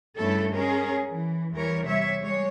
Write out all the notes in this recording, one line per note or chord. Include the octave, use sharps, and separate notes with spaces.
G2 C#3 A3 E4 A4
G#3 C#4 G#4 A#4
E3
E2 E3 G3 A#4 C#5
C3 G3 C#5 E5
G3 G#3 C#5